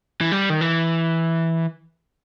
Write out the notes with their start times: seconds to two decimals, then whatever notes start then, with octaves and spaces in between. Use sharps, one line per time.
0.21 E3
0.32 G3
0.50 D#3
0.61 E3